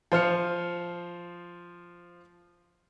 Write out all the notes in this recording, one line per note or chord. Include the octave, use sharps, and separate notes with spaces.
F3 C5 F6 C#7